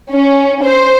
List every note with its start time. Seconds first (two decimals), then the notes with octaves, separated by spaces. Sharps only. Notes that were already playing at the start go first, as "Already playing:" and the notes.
0.11 C#4
0.64 C5